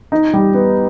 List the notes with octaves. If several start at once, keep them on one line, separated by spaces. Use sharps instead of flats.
D#4
G3
B3